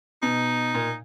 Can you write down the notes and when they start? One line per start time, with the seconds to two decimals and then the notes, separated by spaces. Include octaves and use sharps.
0.22 B2 D#4
0.75 A#2